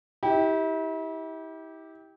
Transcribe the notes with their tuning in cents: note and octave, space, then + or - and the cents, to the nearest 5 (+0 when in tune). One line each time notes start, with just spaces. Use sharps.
E4 -40 G4 +0